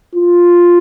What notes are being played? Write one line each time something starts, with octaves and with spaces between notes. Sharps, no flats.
F4